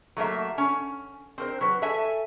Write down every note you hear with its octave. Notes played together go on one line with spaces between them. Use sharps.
F#3 A3 A#3 E5
C#4
C4 A#4 C5
F#3 B4
A4 E5 G#5